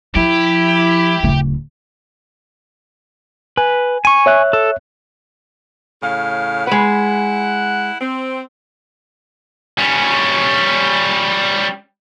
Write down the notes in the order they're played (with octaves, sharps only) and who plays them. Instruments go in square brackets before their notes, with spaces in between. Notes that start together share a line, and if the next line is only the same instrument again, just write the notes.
[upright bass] F3 [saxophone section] E4 [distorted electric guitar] G4
[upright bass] D1 C#3
[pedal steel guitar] B4 [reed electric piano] G#5
[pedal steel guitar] G#5 C#6
[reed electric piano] C#5 E5 F#6
[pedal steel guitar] A4
[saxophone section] A2 C#3 F5
[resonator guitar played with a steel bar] G#3 B4 [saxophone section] E4 F#5
[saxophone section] C4
[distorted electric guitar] G3 C#4